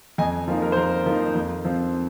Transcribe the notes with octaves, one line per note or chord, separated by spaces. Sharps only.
F2 D#5 G#5
F3 A#3 D#4
A#4
C5
F2 A#4
F3 A#3 D#4
F2
F3 C4